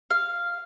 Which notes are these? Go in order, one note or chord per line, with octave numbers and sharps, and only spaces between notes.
F5